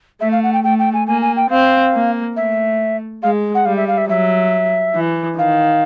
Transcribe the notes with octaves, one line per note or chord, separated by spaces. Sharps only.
A3 E5
F5
F#5
G5
A3 G5
G5
G#5
A#3 G#5
G#5
G5
C4 F5
A#3
A3 E5
G#3 F5
F#5
G3 F5
E5
F5
E5
F#3 E5
E3
D#3 F5